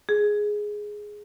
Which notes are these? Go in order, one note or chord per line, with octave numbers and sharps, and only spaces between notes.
G#4